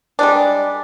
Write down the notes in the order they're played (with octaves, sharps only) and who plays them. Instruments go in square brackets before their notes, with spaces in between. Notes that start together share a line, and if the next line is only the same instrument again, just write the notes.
[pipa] G3 G#3 D4